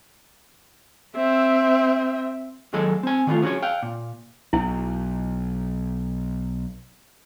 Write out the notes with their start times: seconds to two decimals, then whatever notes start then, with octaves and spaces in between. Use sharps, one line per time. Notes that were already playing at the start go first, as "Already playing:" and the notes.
1.16 C4 E5
2.73 D#2 F#3 G#3 G#4 A4 D#5
3.03 C4 G#5
3.27 D#3 E3 G3 A3 F4
3.42 B3 C#4 F#4 G#4 C#5
3.63 F5 G5
3.83 A#2
4.53 B1 E4